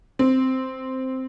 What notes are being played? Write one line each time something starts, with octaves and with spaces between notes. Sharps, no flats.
C4